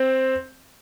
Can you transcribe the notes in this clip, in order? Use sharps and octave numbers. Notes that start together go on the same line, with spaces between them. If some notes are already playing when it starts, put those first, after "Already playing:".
Already playing: C4